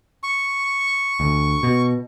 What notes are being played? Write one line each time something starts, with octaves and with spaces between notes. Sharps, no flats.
C#6
D2
B2